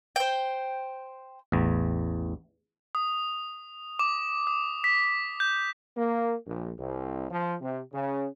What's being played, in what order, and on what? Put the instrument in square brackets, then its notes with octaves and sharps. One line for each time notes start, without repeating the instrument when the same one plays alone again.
[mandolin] C5 G5
[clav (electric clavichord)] A1 E2
[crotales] D#6
D6
D#6
B6
G6
[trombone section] A#3
A#1
C2
F3
C3
C#3